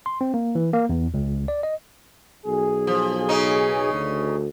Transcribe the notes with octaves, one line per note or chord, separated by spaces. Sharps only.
C6
C4
A#3
E3
A#3
E2
C#2
D5
D#5
B1 G#4
F3
C#3 C#4 D#4
D2